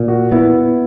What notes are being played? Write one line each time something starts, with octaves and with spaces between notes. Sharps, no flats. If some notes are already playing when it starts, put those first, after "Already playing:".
Already playing: A#2
F#4
B3 E4